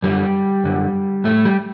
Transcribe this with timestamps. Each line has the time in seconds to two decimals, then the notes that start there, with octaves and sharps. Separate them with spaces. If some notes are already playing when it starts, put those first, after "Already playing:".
0.03 F#2 D3 G3
0.64 F#2 D3
1.24 A2 A3
1.45 G3